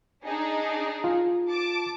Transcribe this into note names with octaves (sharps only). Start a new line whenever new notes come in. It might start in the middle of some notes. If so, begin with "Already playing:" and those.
D4 D#4 G#4
F4
A5 D6 D7